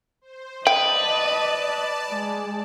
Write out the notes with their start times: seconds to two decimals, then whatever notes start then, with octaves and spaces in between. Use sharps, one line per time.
0.21 C5
0.67 B4 D5 D#5 G5 A5
2.09 G#3